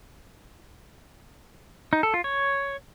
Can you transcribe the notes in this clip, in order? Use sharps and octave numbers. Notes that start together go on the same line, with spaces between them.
D#4
A4
F4
C#5